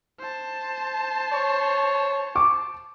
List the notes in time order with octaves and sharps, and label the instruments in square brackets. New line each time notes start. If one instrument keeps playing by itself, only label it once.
[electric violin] C5 A5
[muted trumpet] C#5
[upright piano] C#6 D6